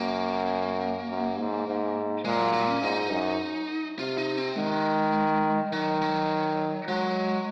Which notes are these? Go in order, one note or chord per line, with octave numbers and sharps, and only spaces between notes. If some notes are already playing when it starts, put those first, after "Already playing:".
Already playing: F#2 A#3
F#2
G#2
G#2
A#2 G#3
F#3
F#3
C#4
G#2 D#4
F#2
C3 F4
D#4
C4
D#3 G#3
D#3 F#3
F#3
F#3 G#3